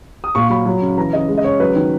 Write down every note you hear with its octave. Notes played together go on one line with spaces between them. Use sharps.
D#6
A#2 C#6
C#6
F#3 B5
F#3
C#3
E3 A#5
C#3 D#5
G#3
D#5
C#3 C#5
F#3 B4
D#3